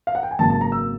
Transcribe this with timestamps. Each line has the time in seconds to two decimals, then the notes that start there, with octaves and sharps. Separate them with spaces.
0.07 F5
0.15 F#5
0.23 G5
0.31 G#5
0.39 G#1 F#2 C#3 F#3 A#3 A5
0.50 A5
0.61 A#5
0.72 E6